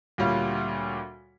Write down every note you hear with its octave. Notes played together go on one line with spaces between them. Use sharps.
D2 A#2 G3 C#5 F5